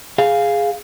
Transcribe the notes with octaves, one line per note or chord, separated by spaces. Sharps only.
G#4 F5